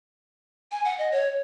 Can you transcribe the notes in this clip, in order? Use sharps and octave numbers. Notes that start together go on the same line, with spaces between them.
G#5
F#5
D#5
C#5